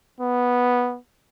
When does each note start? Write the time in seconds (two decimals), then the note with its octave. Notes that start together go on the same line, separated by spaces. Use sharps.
0.20 B3